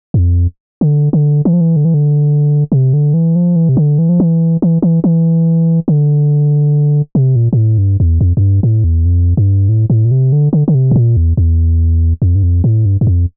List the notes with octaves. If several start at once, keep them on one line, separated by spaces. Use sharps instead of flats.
G2
F2
D3
D3
E3
F3
E3
D3
E3
D3
C3
D3
E3
F3
E3
C3
D3
E3
F3
E3
E3
E3
E3
D3
C3
A#2
A#2
A2
G2
E2
F2
F2
G2
A2
E2
F2
G2
A2
A2
A#2
C3
D3
D3
D3
C3
A2
A#2
E2
E2
F2
G2
F2
A2
G2
G2
F2